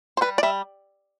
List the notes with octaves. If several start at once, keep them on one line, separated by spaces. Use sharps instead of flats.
C5
G3 B4
D5
G3 E5